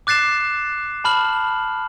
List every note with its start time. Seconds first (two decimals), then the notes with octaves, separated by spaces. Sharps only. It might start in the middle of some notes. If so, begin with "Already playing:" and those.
0.07 D6 F#6 A6 C7 E7
1.04 A5 B5 F6 F#7